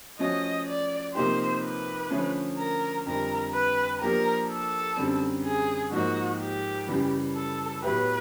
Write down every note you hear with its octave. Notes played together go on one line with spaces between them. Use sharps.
F3 A3 C#4 F#4 D#5
D5
C3 F3 A#3 D#4 G4 C5
B4
D3 F3 A3 C#4
A#4
F2 D3 G3 A#4
B4
F3 A#3 D4 G4 A#4
A4
F#2 D3 G3 C4
G#4
G#2 F3 A#3 D#4 F#4
G4
F#2 C#3 E3 G3
A4
A2 F#3 B3 E4 G4 B4